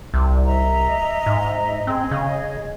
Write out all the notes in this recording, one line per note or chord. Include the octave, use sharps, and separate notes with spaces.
C2
D#5 E5 A#5
G#2
C4 G#4 D#5
C#3